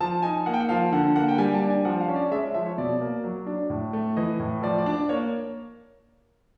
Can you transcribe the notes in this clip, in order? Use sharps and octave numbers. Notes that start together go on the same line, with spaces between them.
F3 A5
D#4 G#5
A#3 F#5
G5
F#5
F3 F5
D3 F#5
A#3 F#5
G5
G3 G#5
A5
D4
G#5
F3 F#5
F5
C#4
D5
G#3 E5
E5
F3 E5
C#5
B2 D5
A#3
F#3
D4
A2
A3
E3 D#5
A2
F3 D5
D5
D4
D5
A#3 C#5